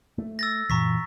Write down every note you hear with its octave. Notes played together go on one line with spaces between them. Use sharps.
A3
E6 A6 A#6
F#2 A#2 E3 A#5 C#6 B6